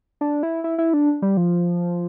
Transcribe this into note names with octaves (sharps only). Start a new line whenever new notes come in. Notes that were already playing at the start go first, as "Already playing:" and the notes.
D4
E4
E4
E4
D4
G3
F3